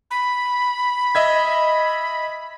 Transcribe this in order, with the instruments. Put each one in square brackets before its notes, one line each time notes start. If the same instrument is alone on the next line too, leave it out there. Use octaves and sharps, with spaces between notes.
[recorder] B5
[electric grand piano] D#5 E5 G#6